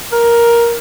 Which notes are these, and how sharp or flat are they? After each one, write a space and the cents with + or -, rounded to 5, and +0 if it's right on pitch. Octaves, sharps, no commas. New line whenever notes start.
A#4 +10